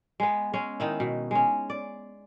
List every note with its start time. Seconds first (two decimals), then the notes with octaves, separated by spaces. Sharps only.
0.20 G#3 B3
0.54 G#3 C#4
0.80 D#3 D#4 E4
1.00 B2
1.31 G#3 C#4
1.70 D5